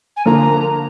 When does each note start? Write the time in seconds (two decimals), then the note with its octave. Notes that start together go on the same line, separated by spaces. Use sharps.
0.17 G#5
0.26 D3 F3 A#3 A#5